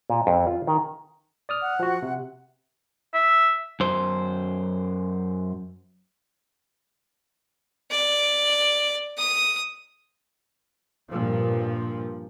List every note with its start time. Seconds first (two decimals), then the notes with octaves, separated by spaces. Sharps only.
0.10 A#2
0.27 F2
0.47 F4
0.67 D#3
1.49 D5 D#6 F6
1.62 F#5
1.79 F3 F#4
2.02 C3
3.14 E5
3.80 F#2 C5
7.91 D5
9.18 D#6
11.09 G2 A#2 F3